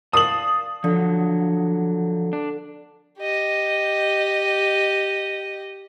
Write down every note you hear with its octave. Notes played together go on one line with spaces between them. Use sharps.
D5 F5 A5 D#6 F#7
D3 F3 F#3
D4
G4 D#5